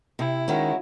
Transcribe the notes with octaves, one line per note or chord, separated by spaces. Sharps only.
C3 E4
D#3 G#3 C#4 F#4